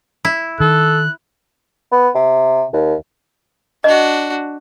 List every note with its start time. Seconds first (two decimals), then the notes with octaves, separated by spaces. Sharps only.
0.25 E4
0.60 D#3 A4 F#6
1.92 B3
2.15 C3
2.73 D#2
3.84 D4 F#4 D#5